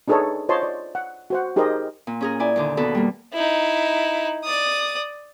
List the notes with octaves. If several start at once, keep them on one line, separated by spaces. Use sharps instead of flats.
D4 D#4 G#4 A4 B4 C#5
F4 C5 C#5 D#5 A5 C6
D5
F#5
F#4 C5 F#5
D#4 G4 G#4 A#4 C5 D#5
A#2
C#4 G#4 A#4
E4 D5 G#5
D#2 D3 D6
D#2 B2 F#4 A4 B4
G3 A#3
D#4 E4
D5 D#6